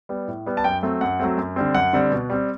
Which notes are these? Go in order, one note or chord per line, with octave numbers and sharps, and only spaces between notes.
G3 B3
A2
G3 B3
A5
F#2 G5
F#3 A3 C4
F#2 F#5
F#3 A3 C4
F#2
D3 G3 C4
F#2 F#5
D3 G3 C4
B2
G3 C4